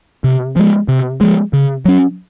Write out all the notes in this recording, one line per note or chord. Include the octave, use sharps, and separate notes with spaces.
C3
F3 G#3
C3
F3 G#3
C#3
F#3 C#4